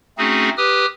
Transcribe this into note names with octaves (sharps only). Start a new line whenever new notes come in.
A3 C4 C#4 D#4 F#4 G#4
G4 B4 D#6 F6